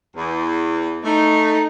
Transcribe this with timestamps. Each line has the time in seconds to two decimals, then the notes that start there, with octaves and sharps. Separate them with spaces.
0.16 E2
1.05 A3 D#4